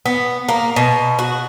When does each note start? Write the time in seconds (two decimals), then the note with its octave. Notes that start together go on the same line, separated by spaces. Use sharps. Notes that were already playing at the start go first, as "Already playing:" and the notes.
0.06 B3
0.48 A#3
0.76 B2
1.19 F#4